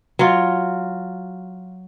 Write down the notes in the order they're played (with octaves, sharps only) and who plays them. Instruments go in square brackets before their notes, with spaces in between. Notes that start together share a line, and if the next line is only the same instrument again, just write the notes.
[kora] F#3 F4